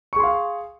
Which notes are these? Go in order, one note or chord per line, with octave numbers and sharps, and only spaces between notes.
G#4 F5 C6 C#6